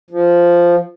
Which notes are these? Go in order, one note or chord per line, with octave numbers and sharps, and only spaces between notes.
F3